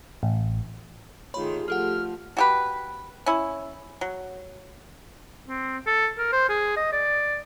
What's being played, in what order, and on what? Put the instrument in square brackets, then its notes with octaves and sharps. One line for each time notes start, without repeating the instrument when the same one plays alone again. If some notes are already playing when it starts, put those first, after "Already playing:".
[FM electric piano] A1
[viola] D#3 F4 [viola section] A3 G4 G#4 [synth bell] C#5 B5 C6
[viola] F3 [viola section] A3 [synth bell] G4 A4 F#5 [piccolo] F6
[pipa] F#4 G4 B4
C#4 E4
F#3
[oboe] C4
A4
A#4
C5
G#4
D#5
D5